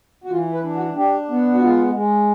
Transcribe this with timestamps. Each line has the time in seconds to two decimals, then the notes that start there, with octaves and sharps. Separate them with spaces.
0.24 F#4
0.30 E3 F4
0.52 B4
0.64 D4
0.75 F#4
0.96 D4 G4
1.30 B3
1.54 F#4
1.62 G#3 F4
1.94 G#3